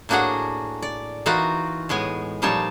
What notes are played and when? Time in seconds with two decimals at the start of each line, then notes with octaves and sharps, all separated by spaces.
0.09 A2 A#3 D4 F#4 G#4 F#5
0.82 D5
1.26 E3 D#4 F4 F#4 A#4 F#5
1.89 A2 G#3 B3 G#5
2.42 A#2 F3 G3 D#4 C#5 A5